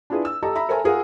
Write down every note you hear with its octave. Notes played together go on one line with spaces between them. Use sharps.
D4 E4 F4 G#4 B4
E6
G4 A4 D#5 A5 A#5
E5 A#5 B5
A4 A#4 C5 E5 G#5 A#5
F4 G#4 A#4 F5 F#5